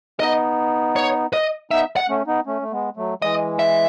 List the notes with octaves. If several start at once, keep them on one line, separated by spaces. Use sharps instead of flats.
B3 D#4 D#5
C#5
D#5
B3 D#4 E5
F#5
A3 C#4
B3 D#4
A3 C#4
A3
G#3 B3
F#3 A3
E3 G#3 D#5
E5